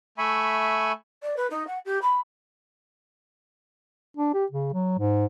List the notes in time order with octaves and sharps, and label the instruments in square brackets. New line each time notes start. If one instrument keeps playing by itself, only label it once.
[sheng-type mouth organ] A3 E5 G#5 B5 C#6
[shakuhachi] D5
B4
D#4
F#5
G4
B5
[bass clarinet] D4
G4
C#3
F#3
G#2